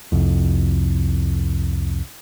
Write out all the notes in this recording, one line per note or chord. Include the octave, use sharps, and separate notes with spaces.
C2 F2